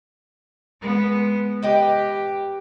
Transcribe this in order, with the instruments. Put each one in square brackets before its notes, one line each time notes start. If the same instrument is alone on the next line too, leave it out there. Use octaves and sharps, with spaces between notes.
[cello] G#3 B3
[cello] G4 [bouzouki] B4 D#5 G5